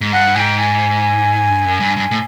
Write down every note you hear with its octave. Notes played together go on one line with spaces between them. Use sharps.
G#2
G2 F#5
G#2 G5 G#5
G#5
G2
F#2
G2
G2
A2